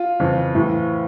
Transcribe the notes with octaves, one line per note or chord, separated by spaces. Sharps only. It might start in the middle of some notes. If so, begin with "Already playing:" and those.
Already playing: F4
F2 C#3 E3
A2 E3